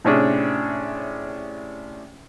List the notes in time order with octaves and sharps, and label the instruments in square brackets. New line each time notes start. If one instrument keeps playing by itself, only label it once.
[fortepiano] A2 C3 C#4 D4 G#4